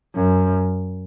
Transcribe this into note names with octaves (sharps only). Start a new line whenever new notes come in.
F#2